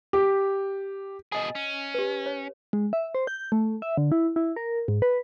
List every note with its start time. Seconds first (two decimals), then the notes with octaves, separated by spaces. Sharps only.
0.13 G4
1.32 B2 G#4 D#5 G#5
1.55 C#4
1.94 G4 B4
2.26 C#5
2.73 G#3
2.93 E5
3.15 C5
3.27 G6
3.52 A3
3.82 E5
3.98 D3
4.12 E4
4.36 E4
4.56 A#4
4.88 G#2
5.02 B4